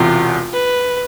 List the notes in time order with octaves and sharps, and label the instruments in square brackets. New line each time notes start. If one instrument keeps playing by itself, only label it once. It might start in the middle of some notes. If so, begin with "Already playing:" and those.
Already playing: [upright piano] E1 E2 C3 [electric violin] F4
[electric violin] B4